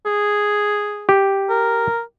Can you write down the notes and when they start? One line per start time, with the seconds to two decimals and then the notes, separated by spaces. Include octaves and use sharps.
0.06 G#4
1.09 G4
1.50 A#4